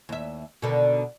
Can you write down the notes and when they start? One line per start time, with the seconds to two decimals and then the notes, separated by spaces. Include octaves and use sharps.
0.09 D#2 E5
0.62 B2 D3 D#3